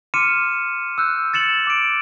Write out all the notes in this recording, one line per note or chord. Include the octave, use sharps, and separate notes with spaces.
C6 D6 F6 C#7 D#7 E7
E6 F#6 G6
A6 C#7 E7 F#7
D6 D7